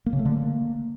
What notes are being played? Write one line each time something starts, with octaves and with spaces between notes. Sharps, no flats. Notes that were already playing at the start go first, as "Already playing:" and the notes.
A#3
C#3
A3
D3
A#3